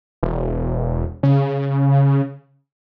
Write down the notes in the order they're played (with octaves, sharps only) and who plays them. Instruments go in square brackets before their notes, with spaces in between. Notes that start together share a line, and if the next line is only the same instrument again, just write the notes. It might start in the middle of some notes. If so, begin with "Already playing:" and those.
[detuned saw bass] E1
C#3